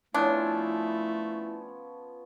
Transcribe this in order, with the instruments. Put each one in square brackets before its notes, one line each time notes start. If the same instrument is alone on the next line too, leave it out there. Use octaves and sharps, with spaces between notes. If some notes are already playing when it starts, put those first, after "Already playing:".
[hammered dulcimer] F3 B3 C#4 [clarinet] A3 [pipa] D4 [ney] E4